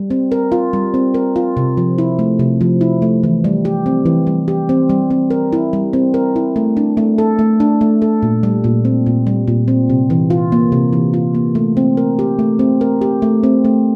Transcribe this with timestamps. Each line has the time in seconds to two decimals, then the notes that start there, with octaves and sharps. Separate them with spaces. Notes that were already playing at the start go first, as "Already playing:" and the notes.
Already playing: G3
0.10 C4
0.32 A#4
0.52 F4
0.73 G3
0.94 C4
1.14 A#4
1.36 F4
1.57 C3
1.77 F3
1.98 E4
2.19 A3
2.39 C3
2.61 F3
2.81 E4
3.02 A3
3.23 E3
3.44 G3
3.65 G4
3.86 C4
4.06 E3
4.27 G3
4.48 G4
4.69 C4
4.89 G3
5.10 C4
5.31 A#4
5.53 E4
5.73 G3
5.93 C4
6.14 A#4
6.36 E4
6.56 A3
6.77 D4
6.97 A3
7.18 A4
7.39 A3
7.60 D4
7.81 A3
8.02 A4
8.23 A#2
8.43 G3
8.64 A#2
8.85 C4
9.06 A#2
9.27 G3
9.48 A#2
9.68 C4
9.90 C3
10.10 E3
10.30 F4
10.52 A#3
10.72 C3
10.93 E3
11.14 F4
11.35 A#3
11.55 A3
11.77 C4
11.97 A#4
12.19 G4
12.39 A3
12.59 C4
12.81 A#4
13.01 G4
13.22 A3
13.43 C4
13.65 A3